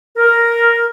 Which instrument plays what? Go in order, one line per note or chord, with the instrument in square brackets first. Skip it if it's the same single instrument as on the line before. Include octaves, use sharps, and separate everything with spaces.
[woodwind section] A#4